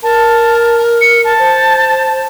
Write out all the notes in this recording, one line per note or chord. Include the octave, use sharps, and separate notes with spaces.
A#4 A5
C#7
A5
C5